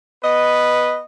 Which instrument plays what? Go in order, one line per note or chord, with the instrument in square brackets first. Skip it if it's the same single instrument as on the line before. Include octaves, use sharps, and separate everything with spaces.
[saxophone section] B3 D#5 [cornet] B4